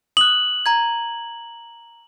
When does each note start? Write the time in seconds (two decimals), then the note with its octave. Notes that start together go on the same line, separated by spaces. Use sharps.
0.17 D#6 F#6 F#7
0.66 A#5 G#6